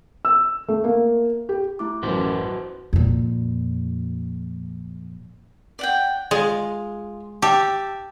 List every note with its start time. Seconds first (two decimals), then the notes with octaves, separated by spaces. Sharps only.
0.25 E6
0.68 A3
0.84 A#3
1.49 G4
1.79 A3 E4 D6
2.03 A1 F#2 F#4 B4 C5
2.93 F2 A#2
5.79 D5 F#5 G5
6.31 G#3 F4
7.42 G4 E5 A5